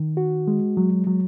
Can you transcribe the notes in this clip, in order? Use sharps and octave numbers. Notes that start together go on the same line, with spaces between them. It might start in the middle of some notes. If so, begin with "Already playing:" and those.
Already playing: D#3
F#4
G#3
F#3
F#3